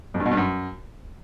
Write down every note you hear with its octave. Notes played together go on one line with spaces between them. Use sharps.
F2
G2
B2
G2
F#2